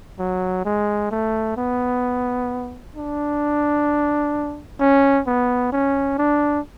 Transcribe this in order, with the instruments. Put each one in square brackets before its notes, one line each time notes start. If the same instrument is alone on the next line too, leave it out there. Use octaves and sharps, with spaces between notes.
[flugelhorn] F#3
G#3
A3
B3
D4
C#4
B3
C#4
D4